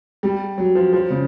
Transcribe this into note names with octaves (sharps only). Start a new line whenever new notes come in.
G3
F#3
F3
F3
C#3